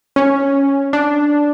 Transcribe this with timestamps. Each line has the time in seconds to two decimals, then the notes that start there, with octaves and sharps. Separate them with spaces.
0.16 C#4
0.93 D4